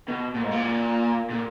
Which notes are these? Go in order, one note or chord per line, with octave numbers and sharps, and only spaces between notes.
B2
A#2
G#2
A#2
A#2